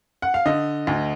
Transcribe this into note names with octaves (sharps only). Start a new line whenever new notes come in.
F#5
F5
D3 D#5
D2